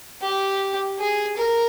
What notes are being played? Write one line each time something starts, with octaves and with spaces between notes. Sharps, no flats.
G4
G#4
A#4